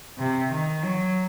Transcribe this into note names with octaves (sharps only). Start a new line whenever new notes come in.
C3
D#3
F#3